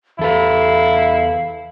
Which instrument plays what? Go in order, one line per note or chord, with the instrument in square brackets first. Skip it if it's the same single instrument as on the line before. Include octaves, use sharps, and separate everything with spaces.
[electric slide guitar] E2 A4 B4 [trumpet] E4 [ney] F5